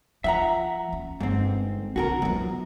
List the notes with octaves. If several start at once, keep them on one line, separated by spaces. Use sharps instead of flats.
F3 E5 F#5 A#5
C#4
G1 G#2 C4
B1 D3 F#4 G#4 A#4
F#2 F3 B3